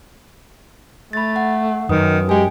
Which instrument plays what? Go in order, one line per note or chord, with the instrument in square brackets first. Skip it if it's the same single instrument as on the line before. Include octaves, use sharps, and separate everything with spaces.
[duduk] A3 [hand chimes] B5 A6
[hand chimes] F#5
[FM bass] F#2 [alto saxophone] D#3 [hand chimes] B4 D#6
[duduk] G#3 [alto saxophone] G4 [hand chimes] G5 G#5